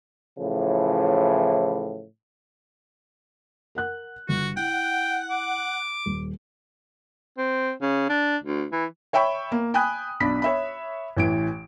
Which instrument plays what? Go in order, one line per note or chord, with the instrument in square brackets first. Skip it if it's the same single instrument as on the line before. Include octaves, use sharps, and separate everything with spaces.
[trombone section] A2 C#3 E3 F3
[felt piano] A#4 F#5 F#6
[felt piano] G1 [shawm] F#4
[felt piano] E4 [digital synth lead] F#5 [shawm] G5
[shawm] D6
[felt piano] D#1
[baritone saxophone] C4
C#3
D4
D2
E3
[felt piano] C#5 E5 G5 B5 C#6
A#3
G5 G#5 B5 D#6 F#6
B1 D4 B5 B6
C#5 E5 B5
A1 E3 D7